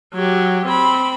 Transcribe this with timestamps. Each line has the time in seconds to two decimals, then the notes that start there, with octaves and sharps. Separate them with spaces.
0.14 F#3 G4
0.65 C4 B5